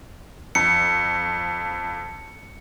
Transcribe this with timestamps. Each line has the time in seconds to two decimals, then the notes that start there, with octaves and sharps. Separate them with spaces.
0.55 F2 C#7